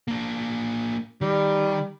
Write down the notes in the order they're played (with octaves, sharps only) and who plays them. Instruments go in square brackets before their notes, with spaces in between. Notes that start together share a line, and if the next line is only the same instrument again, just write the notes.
[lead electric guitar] A#3 D4
[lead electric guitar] D#3 [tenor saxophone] G3